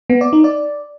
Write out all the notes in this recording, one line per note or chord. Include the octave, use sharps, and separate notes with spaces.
B3
D5
D#4
D5